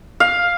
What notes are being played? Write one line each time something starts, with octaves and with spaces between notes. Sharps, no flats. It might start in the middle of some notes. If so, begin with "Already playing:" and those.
F5